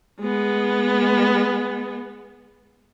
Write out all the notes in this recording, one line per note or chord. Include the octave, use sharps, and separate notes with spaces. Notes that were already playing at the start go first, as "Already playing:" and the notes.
G#3 B3